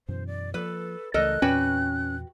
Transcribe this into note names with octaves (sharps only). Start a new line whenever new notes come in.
F#2 B2 E3 C5
D5
F3 A#3 A4 B4
C#2 E3 A3 A4 A#4 D#5 F#6
E2 A#2 C4 C#4 F#4 B4 G5